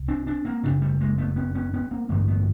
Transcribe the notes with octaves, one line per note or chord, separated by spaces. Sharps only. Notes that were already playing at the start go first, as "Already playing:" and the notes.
Already playing: C2
C4 D4
C4 D4
A#3 C4
F#1 F#2 C#3 C4 D4
G3 A3
G#3 A#3
A3 B3
B3 C#4
B3 C#4
B3 C#4
A#3 C4
A1 G2 D3 A3 B3
A3 B3